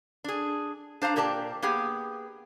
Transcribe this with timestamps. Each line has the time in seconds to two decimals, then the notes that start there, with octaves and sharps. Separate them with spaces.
0.24 D4 G#4
1.02 D4 C5 F5 A#5
1.16 A#2 G4 A#4 D5 A5
1.62 A#3 B3 G4 G#4